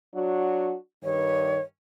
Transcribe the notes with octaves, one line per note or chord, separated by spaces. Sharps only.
F#3 D4 F#4
G2 D#3 C#5